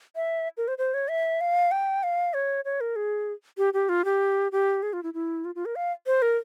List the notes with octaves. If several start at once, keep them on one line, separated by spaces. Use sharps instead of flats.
E5
A#4
C5
C5
C#5
E5
F5
G5
F5
C#5
C#5
A#4
G#4
G4
G4
F4
G4
G4
G#4
F4
E4
E4
F4
F4
A#4
F5
C5
A#4